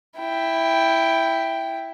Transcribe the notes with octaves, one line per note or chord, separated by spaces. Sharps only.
E4 G5